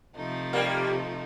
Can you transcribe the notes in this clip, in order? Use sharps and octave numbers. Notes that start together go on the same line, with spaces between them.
C3 F3 A3 D#4
G3 A#3